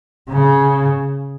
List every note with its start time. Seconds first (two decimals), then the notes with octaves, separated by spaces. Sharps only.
0.30 C#3